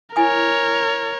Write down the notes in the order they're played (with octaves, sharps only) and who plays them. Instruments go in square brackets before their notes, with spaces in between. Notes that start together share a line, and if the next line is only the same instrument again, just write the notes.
[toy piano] E4 G#5 D#6 [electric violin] A#4 C#5